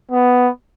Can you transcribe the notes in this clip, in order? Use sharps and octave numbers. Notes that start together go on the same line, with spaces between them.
B3